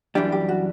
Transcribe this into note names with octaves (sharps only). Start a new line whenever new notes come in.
F#2 E3 G3 D4 G4
G4
F#4